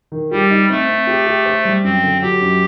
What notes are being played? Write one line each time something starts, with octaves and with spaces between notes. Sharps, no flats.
D#3
G3 G4
D#4
A3 C4
C4
G4
G4
C5
G3
F#2 C4
D3
F#3 G4
F#2